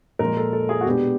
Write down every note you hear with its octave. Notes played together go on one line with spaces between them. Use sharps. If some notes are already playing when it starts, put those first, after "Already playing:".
A#2 F3 G#3 A#4
A4
A4
G#4
F#4
B2 G#3 B3 D4 G4